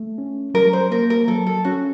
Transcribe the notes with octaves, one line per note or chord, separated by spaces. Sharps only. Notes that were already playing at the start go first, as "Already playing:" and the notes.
Already playing: A3
C#4
F#3 A#4
C5
A#3 A#4
A#4
F#3 A4
A4
C#4 F#4